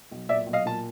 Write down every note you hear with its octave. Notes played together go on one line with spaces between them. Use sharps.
B1
A#2 D5 E5
B1
D#5 F5
A#2 A5